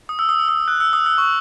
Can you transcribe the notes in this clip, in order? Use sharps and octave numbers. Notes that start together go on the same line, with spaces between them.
D#6
E6
D#6
E6
D#6
F#6
E6
D#6
E6
C#6